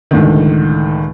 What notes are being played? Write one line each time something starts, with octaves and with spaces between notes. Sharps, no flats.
C#2 A2 D3 D#3